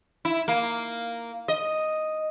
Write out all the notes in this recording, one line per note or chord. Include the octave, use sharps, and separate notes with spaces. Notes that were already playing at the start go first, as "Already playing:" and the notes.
E4
A#3
D#5